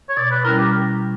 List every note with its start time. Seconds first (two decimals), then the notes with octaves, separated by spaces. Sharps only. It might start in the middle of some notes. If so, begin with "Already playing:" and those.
0.09 C#5
0.17 B2 D5
0.31 B4
0.44 G3 C#4 E4 A#4
0.58 G4